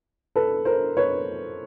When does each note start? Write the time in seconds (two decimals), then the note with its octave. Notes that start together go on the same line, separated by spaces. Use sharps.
0.36 A4 B4
0.65 A#4 C5
0.97 B4 C#5